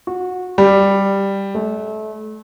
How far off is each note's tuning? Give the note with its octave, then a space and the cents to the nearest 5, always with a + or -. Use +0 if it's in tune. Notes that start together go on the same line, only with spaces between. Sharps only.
F#4 -20
G3 +5
A3 -30